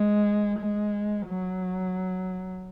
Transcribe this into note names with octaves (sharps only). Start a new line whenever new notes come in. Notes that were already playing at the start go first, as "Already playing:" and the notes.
Already playing: G#3
G#3
F#3